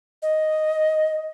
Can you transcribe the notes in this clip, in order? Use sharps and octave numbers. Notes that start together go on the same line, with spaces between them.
D#5